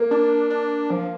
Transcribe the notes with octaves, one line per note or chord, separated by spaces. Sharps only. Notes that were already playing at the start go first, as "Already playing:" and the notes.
Already playing: A#3
D4
D4
F3